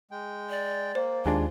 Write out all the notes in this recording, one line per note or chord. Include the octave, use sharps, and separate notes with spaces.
G#3 G5
D5
A#3 C5
D#2 G#3 D4 F4